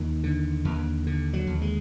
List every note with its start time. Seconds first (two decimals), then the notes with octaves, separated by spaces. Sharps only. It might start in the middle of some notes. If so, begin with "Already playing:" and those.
Already playing: D#2 D#3
0.24 D3
0.65 D#2
1.07 D3
1.33 F#3
1.47 D#2
1.62 G#3